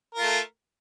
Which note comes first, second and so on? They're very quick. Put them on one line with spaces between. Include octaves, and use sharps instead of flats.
A#4 F4 A3